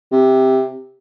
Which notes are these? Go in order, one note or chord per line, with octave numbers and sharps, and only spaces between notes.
C3